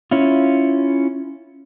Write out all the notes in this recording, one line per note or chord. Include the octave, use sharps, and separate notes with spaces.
C#4 E4 F4